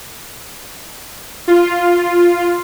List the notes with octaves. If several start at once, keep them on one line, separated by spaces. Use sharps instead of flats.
F4